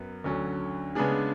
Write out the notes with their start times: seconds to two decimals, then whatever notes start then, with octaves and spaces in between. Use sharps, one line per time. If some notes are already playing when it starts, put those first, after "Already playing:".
Already playing: F#2 B3
0.24 D2 D3 F#3 C#4
0.95 C#3 G#3 B3 D4 G#4